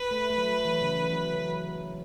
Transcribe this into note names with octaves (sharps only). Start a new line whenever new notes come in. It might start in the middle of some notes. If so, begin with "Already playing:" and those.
Already playing: B4
A3
A3
F#3
E3
C#3
E3
E3
F#3
F#3
F#3